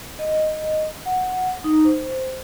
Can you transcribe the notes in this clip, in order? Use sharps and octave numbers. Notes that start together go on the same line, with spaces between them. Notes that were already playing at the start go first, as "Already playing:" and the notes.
D#5
F#5
D#4
C5